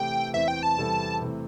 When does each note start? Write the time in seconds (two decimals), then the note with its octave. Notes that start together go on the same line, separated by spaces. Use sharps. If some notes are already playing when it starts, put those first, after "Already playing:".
Already playing: C3 E3 A3 E4 G4 G5
0.33 E2 E3 C4 E5
0.48 G5
0.63 A5
0.77 E2 C3 G3 E4 A4
1.22 C3 E3 A3